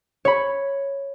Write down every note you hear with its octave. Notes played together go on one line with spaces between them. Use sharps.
C#5 B5